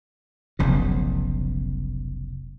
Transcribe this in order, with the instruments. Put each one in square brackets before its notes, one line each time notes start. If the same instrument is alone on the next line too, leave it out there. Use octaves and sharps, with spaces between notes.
[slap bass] F1 B1 C#3